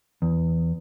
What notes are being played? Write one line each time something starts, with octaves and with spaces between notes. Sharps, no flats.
E2